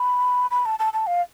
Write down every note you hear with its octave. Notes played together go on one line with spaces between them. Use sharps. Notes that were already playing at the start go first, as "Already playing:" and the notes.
Already playing: B5
B5
A5
A5
A5
F5